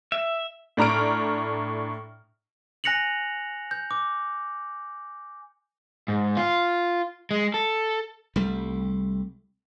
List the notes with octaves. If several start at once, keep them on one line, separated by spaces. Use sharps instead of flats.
E5
A2 D4 A#5 F6 D7
G#5 F#6 A#6 C#7 F7 F#7
G6
D6
G#2
F4
G#3
A4
C2 G3 A3